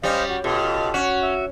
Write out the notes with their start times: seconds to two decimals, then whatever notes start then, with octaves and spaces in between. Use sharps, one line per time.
0.03 G3 C#4 C5 D#5 F5
0.29 F#4
0.44 B2 F4 G4 A4
0.94 C#4 F#4
1.22 E5